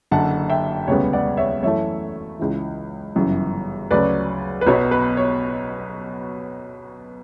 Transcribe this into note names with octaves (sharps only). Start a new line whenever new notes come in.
F#1 F#2 D3 F#5 A5
E5 G5
E1 D2 C#3 G3 B3 C#5
D5 F#5
C#5 E5
F#2 E3 A3 C#5 E5
C#2 C#3 E3
G1 F#2 C#3 E3
D2 C#3 F#3 B4 D5
B4
B1 B2 F#3 B3 C#5
B4
C#5